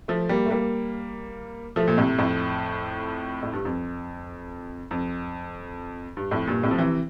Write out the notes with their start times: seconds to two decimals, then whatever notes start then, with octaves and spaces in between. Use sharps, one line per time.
0.08 F3 A3
0.29 G3 A#3
0.46 A3
0.50 G3 A#3
1.76 F3 A3
1.87 A#2
1.97 A2 C3
2.18 F2 A2
3.43 A2
3.53 G2
3.65 F2
4.91 F2
6.17 G2
6.31 F2 A2
6.47 G2 A#2
6.63 A2 C3
6.71 F3
6.79 C3 E3